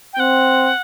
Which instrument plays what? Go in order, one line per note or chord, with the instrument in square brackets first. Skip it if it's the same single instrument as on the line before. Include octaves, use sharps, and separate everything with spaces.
[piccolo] G5
[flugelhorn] C4 [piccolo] F#5